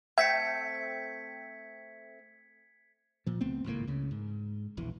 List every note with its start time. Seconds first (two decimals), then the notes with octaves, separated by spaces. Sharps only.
0.18 A3 C4 E5 G5 G#6 B6 C#7
3.26 A#2 F3
3.41 C#2 A3 B3 C4
3.64 G#1 C#2 A2 A#3
3.87 C#2 C#3
4.11 G#2
4.77 E1 A#1 E2 E3